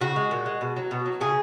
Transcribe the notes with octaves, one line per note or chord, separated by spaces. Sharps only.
C#3 F#4
G#3
A#2
G#3
B2
F#3
B2
F#3
C#3 G#4